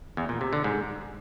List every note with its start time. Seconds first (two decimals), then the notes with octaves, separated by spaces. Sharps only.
0.17 E2
0.29 A#2
0.41 C3
0.53 D3
0.64 G#2